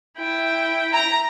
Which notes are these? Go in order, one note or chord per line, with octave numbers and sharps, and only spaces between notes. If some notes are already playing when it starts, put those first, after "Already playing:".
E4 G5
A#5